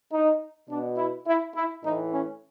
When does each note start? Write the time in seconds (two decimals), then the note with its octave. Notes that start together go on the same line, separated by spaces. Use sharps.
0.12 D#4
0.69 B2 D4
0.97 E4
1.26 E4
1.55 E4
1.83 A2 E3 D#4
2.12 C#4